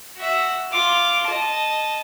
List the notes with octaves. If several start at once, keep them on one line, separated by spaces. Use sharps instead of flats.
F#4 E5
F4 D6
D#5 A5